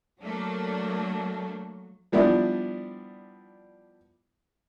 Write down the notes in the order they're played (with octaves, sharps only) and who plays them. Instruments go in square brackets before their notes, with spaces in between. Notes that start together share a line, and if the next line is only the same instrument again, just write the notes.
[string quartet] F#3 [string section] A3 A#3 D4
[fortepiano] F3 G3 B3 D4 E4